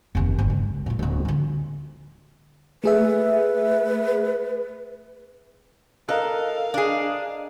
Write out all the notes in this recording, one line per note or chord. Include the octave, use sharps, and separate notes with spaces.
F1 D#2
G1
C#2
A#2 F4
D1 F#3
D3 F4
A3 G#4 B4 E5
A4 A#4 D#5 F5 F#6
D4 G#4